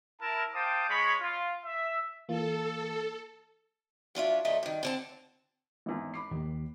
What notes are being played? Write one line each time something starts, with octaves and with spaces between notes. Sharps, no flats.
E4 A#4 A5
C5 F5 G5 A5 D6 D#6
G#3 C#5 B5
F4
E5
E3 A#3 F4 A4
F#3 D4 F4 E5
D2 A#2 A3 D#5 E5
G2 D#3
D3 C4 A5
G#1 E2
B5 D6 C7
D#2 D#3 A#3